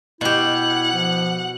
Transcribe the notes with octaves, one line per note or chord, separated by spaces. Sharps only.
B2 E4 G4 F#5
F3